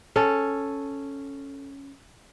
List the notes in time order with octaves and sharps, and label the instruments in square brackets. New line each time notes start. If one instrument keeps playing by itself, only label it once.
[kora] C#4 A4